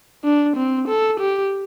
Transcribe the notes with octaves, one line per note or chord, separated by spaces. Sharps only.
D4
C4
A4
G4